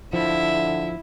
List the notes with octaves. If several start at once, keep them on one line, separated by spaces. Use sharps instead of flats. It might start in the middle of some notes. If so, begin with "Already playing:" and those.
D3 F3 E4 E5